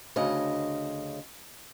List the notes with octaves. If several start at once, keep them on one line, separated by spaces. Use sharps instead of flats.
D2 C#3 D#5